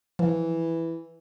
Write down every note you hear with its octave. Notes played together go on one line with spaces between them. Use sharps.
E3 F3